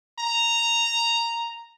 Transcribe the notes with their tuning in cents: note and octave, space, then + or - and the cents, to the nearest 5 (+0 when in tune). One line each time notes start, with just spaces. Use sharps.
A#5 -5